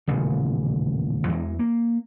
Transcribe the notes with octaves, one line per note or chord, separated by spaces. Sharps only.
D#1 A1 C#3
E2 E3 G#3
A#3